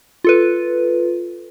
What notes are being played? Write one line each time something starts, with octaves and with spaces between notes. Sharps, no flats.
F4 A4 B4